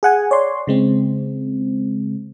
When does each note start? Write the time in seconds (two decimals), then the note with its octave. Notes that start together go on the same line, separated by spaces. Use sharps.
0.03 G#4 F#5 G#5
0.31 C#5 D5 C6
0.67 C#3 G#3 C4